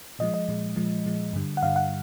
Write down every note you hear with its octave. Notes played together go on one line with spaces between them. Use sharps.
A#2 F3 G#3 D#5
D#5
A#2 F3 G#3
A#2 F3 G#3
A#2 F3 G#3
G2 D3 G3
F#5
G2 D3 G3 F5
F#5